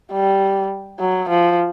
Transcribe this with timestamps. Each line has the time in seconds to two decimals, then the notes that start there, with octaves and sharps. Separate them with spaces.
0.11 G3
1.00 F#3
1.29 F3